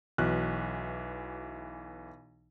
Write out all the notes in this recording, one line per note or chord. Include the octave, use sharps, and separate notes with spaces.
B1 E3 F#4 F6 F#6